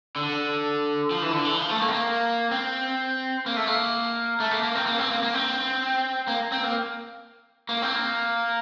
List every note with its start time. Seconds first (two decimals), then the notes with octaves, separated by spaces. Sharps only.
0.16 D3
1.11 F3
1.22 E3
1.33 D3
1.45 E3
1.58 F3
1.69 A3
1.80 A#3
1.89 C4
1.92 A#3
2.51 C4
3.46 A#3
3.57 A3
3.67 A#3
4.40 A3
4.51 A#3
4.63 A#3
4.75 C4
4.86 A#3
4.98 C4
5.11 A#3
5.23 A#3
5.34 C4
6.28 A#3
6.52 C4
6.64 A#3
7.69 A#3
7.82 C4
7.96 A#3